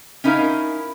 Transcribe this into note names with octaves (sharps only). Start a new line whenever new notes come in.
C#4 D#4 E4 A#4 F5